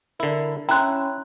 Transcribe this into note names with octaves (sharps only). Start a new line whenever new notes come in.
D3 E4 A#4
C#4 E4 G5 A#5 C6 F#6